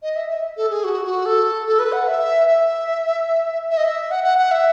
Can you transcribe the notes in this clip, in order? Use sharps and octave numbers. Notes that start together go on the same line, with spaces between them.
D#5
E5
E5
A4
G#4
F#4
F#4
A4
A4
B4
F#5
E5
E5
E5
D#5
E5
F#5
F#5
F#5
E5